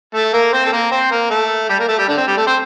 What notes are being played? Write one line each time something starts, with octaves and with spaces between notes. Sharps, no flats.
A3 A4
A#3 A#4
C4 C5
A4
A#3 A#4
C4 C5
A#3 A#4
A3 A4
G3 G4
A#3 A#4
A3 A4
G3 G4
D3 D4
C4
G3 G4
A3 A4
C4 C5